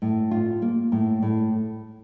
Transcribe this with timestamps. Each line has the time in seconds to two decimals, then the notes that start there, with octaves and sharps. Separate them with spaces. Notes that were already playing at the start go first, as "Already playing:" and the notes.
0.02 A2
0.31 F4
0.62 A#3
0.92 A2
1.22 A2